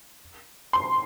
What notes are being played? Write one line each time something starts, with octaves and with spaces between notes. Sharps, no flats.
C6